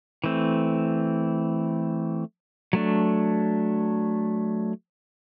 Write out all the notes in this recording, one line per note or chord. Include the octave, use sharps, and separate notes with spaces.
E3 A3 C4
F#3 A3 D4